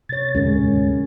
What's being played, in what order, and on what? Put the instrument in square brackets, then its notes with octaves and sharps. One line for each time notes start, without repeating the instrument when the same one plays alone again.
[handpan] C3 C#5 [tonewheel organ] A6
[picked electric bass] E1 D2 G#2 [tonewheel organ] G#3 [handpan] C#4 A#4